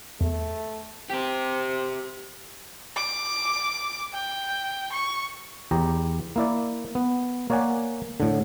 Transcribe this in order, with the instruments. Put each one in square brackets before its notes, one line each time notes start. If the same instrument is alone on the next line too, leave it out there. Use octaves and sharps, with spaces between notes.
[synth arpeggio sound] E2 [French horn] A3
[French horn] C4 [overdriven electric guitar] G4 C5
[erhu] D6
G5
C#6
[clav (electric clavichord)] E2 G4 A#5
A#3 E4 D5
B3
A#3 C#5 D5 F#5 G#5
A2 D3